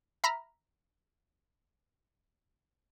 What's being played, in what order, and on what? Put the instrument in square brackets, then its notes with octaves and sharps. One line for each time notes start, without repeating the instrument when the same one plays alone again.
[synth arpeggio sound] E5 A#5 B5 F6